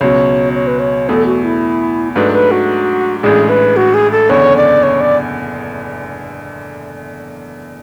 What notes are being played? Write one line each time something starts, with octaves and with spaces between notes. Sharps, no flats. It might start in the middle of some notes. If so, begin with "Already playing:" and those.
C#2 B2 F#3 C#5
C#5
B4
C#5
E2 B2 A3 A4
F#4
E4
G#2 F#3 A3 D4 B4
B4
F#4
A1 A2 G#3 D4 G#4
B4
F#4
G#4
A4
F#1 E2 D3 C#5
D5
C#5
D5